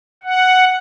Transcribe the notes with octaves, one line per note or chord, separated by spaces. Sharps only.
F#5